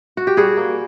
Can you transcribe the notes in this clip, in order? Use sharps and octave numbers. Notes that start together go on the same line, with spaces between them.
F#4
G4
G3 F#4 G#4
A#3